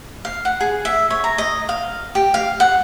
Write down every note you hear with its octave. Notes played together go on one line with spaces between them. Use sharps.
F5
F#5
G#4
E5
C#5
A#5
D#5
F5
G4
F5
F#5